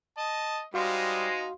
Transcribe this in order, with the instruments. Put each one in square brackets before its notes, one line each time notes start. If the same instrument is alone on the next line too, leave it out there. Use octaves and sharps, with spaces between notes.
[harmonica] D#5 [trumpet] A5
[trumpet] G3 [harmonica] G#3 D#4 C5 [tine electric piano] F#4 F5 C6